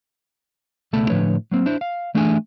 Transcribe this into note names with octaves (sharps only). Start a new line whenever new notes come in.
C#2 B2 A3 A4 A5 B5
A2 D3 F3 B4 C#5
F#3 A#3 C4
D4 E4 C5
F5
E3 A3 D4 G#4 E5 G#5